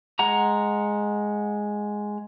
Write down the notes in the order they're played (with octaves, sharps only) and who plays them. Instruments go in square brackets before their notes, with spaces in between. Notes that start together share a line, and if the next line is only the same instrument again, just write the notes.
[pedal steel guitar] G#3 F#5 A#5